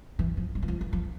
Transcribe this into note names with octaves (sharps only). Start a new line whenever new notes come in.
E3
F3
G3
E3
F3
E3
F3